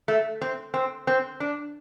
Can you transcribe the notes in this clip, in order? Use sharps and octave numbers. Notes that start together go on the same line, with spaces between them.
A3
C4
C4
C4
D4